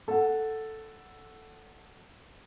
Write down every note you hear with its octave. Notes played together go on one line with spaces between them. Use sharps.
A4 F#5